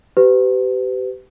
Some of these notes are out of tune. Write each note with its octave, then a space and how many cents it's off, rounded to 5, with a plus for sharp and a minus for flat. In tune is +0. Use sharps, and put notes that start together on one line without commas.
G4 -25 B4 +35